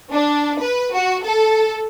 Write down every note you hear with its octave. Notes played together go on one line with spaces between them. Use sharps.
D4
B4
F#4
A4